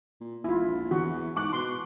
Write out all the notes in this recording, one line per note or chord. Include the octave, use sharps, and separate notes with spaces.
A#2
E1 E4 F4
A#1
E2 E3 F#4
G#2 C#6 D6 F#6
B2 C6